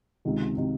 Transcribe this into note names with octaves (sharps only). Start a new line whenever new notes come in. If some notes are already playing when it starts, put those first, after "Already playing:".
C#2 C3 D#3
C3 D#3